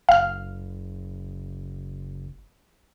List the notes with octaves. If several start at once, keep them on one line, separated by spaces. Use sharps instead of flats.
F#1 F5 F6